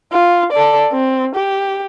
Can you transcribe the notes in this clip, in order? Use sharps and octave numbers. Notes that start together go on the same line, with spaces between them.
F4
A4 D5
C4
G4